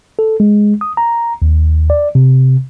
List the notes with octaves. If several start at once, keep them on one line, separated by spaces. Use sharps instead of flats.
A4
G#3
D#6
A#5
D#2
D5
C3